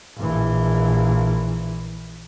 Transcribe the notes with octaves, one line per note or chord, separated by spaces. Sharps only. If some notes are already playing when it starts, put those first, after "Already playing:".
A#1 E3